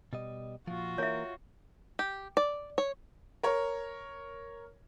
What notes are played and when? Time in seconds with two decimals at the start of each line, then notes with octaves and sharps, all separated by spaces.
0.13 B2 G3 D#5
0.67 A#2 F3 F4 F#4
0.98 E3 A#3 A#4 C#5 E5
1.99 G4
2.37 D5
2.78 C#5
3.43 A#4 C#5